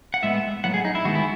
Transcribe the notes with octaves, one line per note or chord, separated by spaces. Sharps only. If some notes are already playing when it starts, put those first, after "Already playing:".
F#5
A2 G#3 B3 E5
A2 F#3 B3 F#5
G#4
D#4
E4
D#3 G#3 B3 F#4
E4